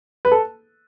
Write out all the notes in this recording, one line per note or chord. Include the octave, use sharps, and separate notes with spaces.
B4
A4